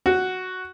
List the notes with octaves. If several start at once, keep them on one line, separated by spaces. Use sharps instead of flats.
F#4